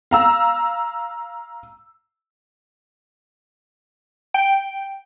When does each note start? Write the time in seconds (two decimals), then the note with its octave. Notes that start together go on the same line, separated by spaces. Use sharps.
0.11 F5 A#5 E6
4.34 G5